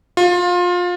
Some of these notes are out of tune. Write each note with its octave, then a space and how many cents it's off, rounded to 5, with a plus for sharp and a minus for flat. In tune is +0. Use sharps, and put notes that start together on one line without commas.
F4 +25